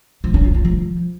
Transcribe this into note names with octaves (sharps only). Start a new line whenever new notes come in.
F3
C#4
F4
F4
F3